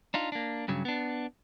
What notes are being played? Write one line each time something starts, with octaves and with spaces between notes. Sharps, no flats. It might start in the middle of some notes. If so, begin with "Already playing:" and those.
D4 D#4 F4
A#3 D4
G2 C#3 F#3
B3 D4